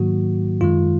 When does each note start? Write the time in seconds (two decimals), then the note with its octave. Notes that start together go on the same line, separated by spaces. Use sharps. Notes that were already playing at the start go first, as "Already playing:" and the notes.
Already playing: G#2 D#3 F#3 A#3 F#4
0.61 F#2 D#3 G#3 F4